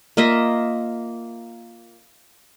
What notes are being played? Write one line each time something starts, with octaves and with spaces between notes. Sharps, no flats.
A#3 F4 D#5 E5